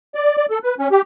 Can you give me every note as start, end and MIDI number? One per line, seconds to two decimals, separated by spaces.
0.15 0.36 74
0.37 0.46 74
0.50 0.59 69
0.63 0.75 71
0.79 0.88 61
0.91 1.02 67